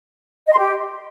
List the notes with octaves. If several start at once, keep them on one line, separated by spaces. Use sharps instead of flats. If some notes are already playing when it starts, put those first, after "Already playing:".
D#5
C6
G4